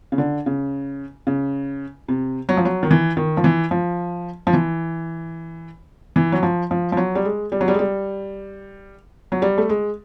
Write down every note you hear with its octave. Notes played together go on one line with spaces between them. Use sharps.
C#3
D3
C#3
C#3
C3
F#3
F3
F#3
D#3
E3
D#3
F3
E3
F3
F3
E3
E3
F#3
F3
F3
F3
F#3
G3
G#3
G3
F#3
G3
G#3
G3
F#3
G3
A3
G#3